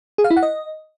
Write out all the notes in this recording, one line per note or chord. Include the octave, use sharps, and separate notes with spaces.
G#4
F5
E4
F#5
D#5